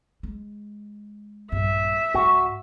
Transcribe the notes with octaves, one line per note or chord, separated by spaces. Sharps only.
G#3
A#1 G2 E5
C#2 G#2 F#4